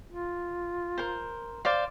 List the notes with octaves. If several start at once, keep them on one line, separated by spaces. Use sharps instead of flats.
F4
A#4 C5
C5 D5 F5